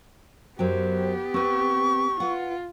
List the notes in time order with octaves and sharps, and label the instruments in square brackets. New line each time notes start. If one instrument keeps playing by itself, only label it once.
[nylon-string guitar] F#2 F#3 G5 [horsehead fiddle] B3 G4 [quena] C5
[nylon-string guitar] C4 B4 [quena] C#6
[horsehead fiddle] F4 [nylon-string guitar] B4 F#5